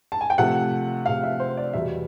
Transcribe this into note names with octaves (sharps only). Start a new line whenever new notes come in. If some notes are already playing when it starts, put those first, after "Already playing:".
A5
G#5
G5
C3 F3 A3 F#5
C3 F3 A3 F5
E5
C5
D5
E2 B2 G3 E5